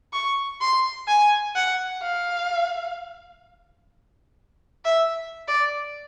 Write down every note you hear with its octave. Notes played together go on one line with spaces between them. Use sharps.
C#6
C6
G#5
F#5
F5
E5
D5